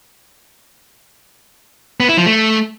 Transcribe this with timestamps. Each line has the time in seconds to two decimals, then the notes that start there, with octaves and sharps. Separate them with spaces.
2.00 B3
2.09 E4
2.17 F3
2.26 A3